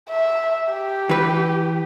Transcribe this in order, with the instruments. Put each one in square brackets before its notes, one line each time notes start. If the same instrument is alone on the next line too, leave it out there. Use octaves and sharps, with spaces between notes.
[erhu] E5
G4
[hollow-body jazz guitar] E3 B4